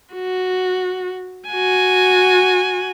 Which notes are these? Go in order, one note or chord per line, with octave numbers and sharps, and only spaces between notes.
F#4
F#4 G#5